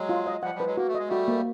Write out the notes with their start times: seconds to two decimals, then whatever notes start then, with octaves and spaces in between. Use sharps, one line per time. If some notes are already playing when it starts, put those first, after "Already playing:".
Already playing: F#3 G#3
0.09 F4
0.27 D#5
0.43 F3 G3 F#5
0.55 F3 G3
0.60 B4
0.66 F#3 G#3
0.77 A#3 F#4
0.87 A3
0.95 G#3 D#5
1.08 G3 A3 F#4
1.28 A#3